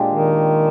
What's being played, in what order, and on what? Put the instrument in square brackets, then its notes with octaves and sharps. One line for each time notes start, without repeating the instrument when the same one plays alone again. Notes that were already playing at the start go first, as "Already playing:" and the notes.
Already playing: [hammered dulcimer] A#2 G#3 D4 G4
[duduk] D#3